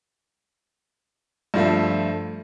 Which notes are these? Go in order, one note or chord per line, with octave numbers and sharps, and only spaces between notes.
G2 F3 A3 E5